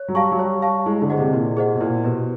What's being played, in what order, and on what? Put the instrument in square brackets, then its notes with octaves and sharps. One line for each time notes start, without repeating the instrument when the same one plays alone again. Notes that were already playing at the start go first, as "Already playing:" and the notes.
Already playing: [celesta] C#5
[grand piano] F#3
[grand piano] G3 [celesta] F5 A5 C#6
[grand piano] F#3
[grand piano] G3 [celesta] C#5
[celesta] F5 A5 C#6
[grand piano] G#3 [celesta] E4
[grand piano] D3
[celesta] G#4 C5 D#5 F#5
[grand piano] C3
[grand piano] A#2 [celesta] E4
[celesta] G#4 C5 D#5 F#5
[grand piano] B2
[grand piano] A#2 [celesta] E4
[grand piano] B2 [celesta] G4 B4